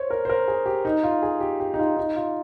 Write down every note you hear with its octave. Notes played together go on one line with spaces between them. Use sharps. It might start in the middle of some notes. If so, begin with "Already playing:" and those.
Already playing: C5 C#5
A#4
C5
A#4
G#4
G4
D#4
F4
G#4
G4
G4
D#4
F4
D#4
F4